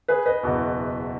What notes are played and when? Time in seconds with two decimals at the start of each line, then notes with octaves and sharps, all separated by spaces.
0.08 G#4 B4
0.26 B4 D#5
0.43 F#1 E2 B2